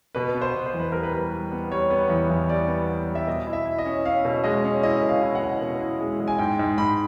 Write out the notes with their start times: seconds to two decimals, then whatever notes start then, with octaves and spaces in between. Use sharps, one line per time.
0.15 B2 B4
0.34 B3
0.41 C5
0.54 B2
0.67 C5
0.73 E2
0.80 B4
0.92 G3 A#4
1.03 B4
1.12 G3
1.32 G3
1.52 B3
1.71 G3 C#5
1.90 B3
2.10 E2
2.30 E2
2.49 G3 D5
2.68 B3
2.88 B3
3.08 G3
3.15 E5
3.27 B2 D#5
3.47 E4
3.53 E5
3.65 E4
3.79 D#5
3.86 C#4
4.05 C#4 F5
4.25 B2
4.44 G#3 D#5
4.64 C#4
4.83 E4 D#5
5.02 B2
5.09 F5
5.22 E4
5.35 F#5
5.42 B2
5.62 B2
5.80 E4
6.00 G#3
6.20 G#3
6.28 G#5
6.38 G#2 G5
6.59 G#2
6.78 G#2 B5